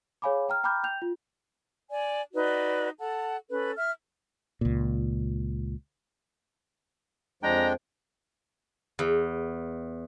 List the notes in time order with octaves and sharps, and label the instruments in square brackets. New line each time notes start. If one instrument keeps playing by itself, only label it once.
[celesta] G#4 C#5 F5 G#5 B5 D6
G5 A#5 F6
G5 A#5 B5 D6 F6 G6
G5 G6 F7
F4
[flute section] D5 G#5
D#4 F#4 B4 D5
A4 F#5 A5
C#4 A4 B4
E5 F6
[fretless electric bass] C#2 A#2
[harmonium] F2 F3 [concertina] G#3 D4 G5 [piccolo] A#5
[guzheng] E2